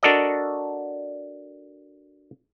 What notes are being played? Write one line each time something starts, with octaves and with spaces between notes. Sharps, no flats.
D4 F#4 A4 A#4 D5 D#5